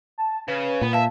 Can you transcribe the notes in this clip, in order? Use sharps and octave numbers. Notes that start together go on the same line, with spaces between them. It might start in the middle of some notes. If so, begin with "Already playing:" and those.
A5
C#3 B4
A#2 B3
E5 F5 A5